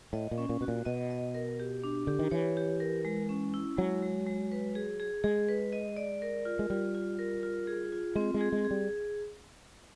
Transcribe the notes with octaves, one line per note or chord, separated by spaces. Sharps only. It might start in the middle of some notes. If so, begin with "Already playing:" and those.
A2 D#5
A#2
C#4
A#2
B2 F#4
A#2
B2 D#5
D#5
A#4
G4
D4
D3 G4
D#3
E3 C#5
G4
A#4
G#3
C#4
E4
F#3 G#3
G#3
G#3
B4
G#4
G#4
G#3 G#4
B4
D#5
D5
A#4
F4
G#3
G3 F4
F4
A#4
F4
G#4
F4
G#3 C4
G#3
G#4
G#3
G#4
G3